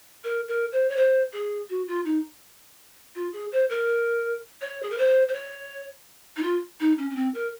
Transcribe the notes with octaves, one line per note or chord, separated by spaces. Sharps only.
A#4
A#4
C5
C#5
C5
G#4
F#4
F4
D#4
F4
G#4
C5
A#4
C#5
G#4
A#4
C5
C5
C#5
D#4
F4
D#4
C#4
C#4
C4
A#4